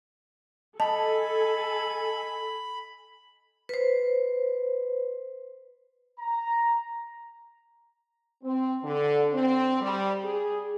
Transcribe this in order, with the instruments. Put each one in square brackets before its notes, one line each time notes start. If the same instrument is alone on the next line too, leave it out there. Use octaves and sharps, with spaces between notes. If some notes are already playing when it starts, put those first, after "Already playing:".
[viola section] A4 G#5 [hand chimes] D#5 [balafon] A5 [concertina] B5
[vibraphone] B4 C5
[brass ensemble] A#5
[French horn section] C4
D3
C4
G3
G#4